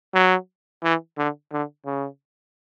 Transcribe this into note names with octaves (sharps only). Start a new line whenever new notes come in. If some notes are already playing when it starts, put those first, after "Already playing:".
F#3
E3
D3
D3
C#3